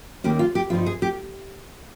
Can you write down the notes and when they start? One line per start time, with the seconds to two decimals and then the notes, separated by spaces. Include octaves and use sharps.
0.24 D#2 D#3 A#3 C#4 G4
0.39 F4
0.55 G4
0.70 G2 F3 C4 D#4 F4
0.86 G#4
1.02 G4